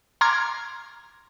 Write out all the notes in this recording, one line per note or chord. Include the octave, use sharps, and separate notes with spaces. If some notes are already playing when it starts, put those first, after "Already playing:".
A#5 C6 D6 F6 G#6